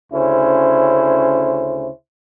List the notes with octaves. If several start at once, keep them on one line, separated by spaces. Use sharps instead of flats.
D2 C#3 C#4 E4 C5